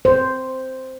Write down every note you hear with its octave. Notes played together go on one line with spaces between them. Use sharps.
C5